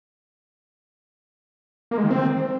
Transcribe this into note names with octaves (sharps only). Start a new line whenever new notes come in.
A#3
G#3
D#3
C4